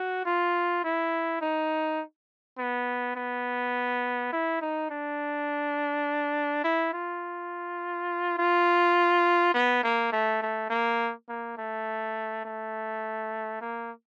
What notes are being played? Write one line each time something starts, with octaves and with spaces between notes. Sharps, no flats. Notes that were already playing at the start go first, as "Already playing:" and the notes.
Already playing: F#4
F4
E4
D#4
B3
B3
E4
D#4
D4
E4
F4
F4
B3
A#3
A3
A3
A#3
A#3
A3
A3
A#3